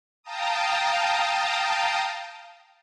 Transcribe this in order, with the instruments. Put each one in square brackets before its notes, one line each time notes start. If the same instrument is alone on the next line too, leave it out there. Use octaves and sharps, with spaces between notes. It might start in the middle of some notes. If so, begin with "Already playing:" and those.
[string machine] F5 G5 A5 A#5 D#6